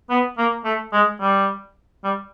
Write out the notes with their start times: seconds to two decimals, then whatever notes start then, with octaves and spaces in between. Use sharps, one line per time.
0.10 B3
0.38 A#3
0.65 A3
0.93 G#3
1.21 G3
2.04 G3